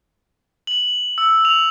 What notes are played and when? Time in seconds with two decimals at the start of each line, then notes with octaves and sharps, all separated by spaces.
0.67 F#7
1.18 E6
1.45 F7